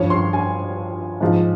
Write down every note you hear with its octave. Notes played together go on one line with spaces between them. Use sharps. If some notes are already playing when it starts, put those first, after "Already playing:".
Already playing: G2 F3 C#5
C6
G#5
G#2 F3